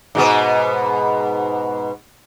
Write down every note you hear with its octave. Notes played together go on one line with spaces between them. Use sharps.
G#2 B2 B3